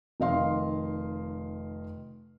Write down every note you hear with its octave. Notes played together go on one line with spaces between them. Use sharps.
F1 D#3 D#5 F5 C6